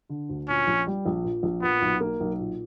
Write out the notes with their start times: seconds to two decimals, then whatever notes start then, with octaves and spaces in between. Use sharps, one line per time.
0.09 D3
0.29 D2
0.49 A#2 C#4
0.67 A#1
0.87 G3
1.06 A#1
1.24 A#2
1.43 A#1
1.62 A#2 B3
1.82 B1
2.01 A#3
2.20 B1
2.39 A#2